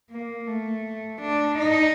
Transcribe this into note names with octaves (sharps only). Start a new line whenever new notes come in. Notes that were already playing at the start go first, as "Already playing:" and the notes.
A#3
A3
D4
D#4